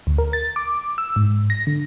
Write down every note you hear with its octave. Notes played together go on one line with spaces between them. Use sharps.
D2
A#4
A6
D6
E6
G#2
A#6
D3